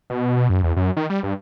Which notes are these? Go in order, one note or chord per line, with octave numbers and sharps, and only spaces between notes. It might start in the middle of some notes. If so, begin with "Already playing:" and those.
B2
B2
F#2
E2
F#2
D#3
G3
G2